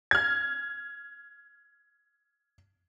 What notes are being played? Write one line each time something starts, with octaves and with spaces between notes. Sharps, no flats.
F6 G#6